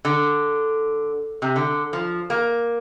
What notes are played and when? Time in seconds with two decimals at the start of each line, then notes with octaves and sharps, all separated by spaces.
0.05 D3
1.42 C3
1.56 D3
1.93 F3
2.30 A#3